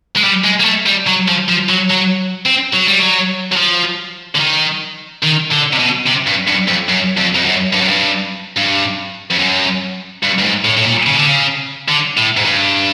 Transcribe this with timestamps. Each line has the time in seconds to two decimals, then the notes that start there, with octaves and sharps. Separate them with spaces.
0.16 G#3
0.24 G3
0.44 G#3
0.60 A#3
0.65 A3
0.86 G3
1.07 F#3
1.28 F3
1.48 F3
1.69 F#3
1.90 F#3
2.46 C4
2.73 F#3
2.87 G3
2.99 F#3
3.52 F#3
3.56 F3
4.35 D3
4.40 D#3
5.23 D#3
5.51 D3
5.73 C3
5.79 B2
6.07 C3
6.27 G2
6.48 G2
6.68 F2
6.89 F#2
7.17 F2
7.35 F2
7.45 F#2
7.73 G2
7.81 F#2
7.88 G2
8.57 G2
9.31 F2
9.39 F#2
10.23 G2
10.39 G2
10.43 G#2
10.65 A2
10.77 A2
10.85 A#2
11.06 C#3
11.15 D3
11.25 C#3
11.89 D3
12.17 A2
12.37 G#2
12.45 G2